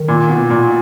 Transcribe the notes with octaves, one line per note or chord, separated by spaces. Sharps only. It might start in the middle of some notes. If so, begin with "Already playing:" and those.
Already playing: D#3
A#2
B2
A#2